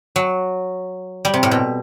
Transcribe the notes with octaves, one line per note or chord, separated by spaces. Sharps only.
F#3
G3
C3
A2
B2